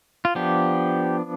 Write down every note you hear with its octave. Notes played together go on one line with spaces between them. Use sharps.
F4
F3 B3 D4 G4